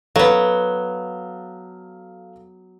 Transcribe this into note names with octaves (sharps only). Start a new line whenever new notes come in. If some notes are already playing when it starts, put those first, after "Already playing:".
F#3 B3 A4 F5